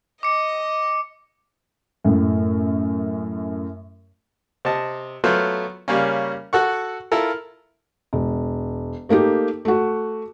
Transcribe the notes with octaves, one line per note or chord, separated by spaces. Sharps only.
D#5 D6 C#7
F#2 A2
C3 D#5 A5
F#3 A3 B3 F4 C5
C#3 G3 A#3 C#4
F#4 A4 F#5 C#6
E4 F4 A4 A#4
E1
A3 A#3 D#4 G4
A3 F#4